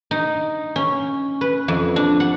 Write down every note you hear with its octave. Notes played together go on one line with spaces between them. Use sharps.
D#4
C#4
B4
F2
D4
F#5